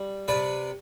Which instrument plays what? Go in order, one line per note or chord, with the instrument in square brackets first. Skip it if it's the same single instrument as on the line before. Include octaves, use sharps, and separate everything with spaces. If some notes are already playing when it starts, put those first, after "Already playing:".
Already playing: [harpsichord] G3
C3 B4 D5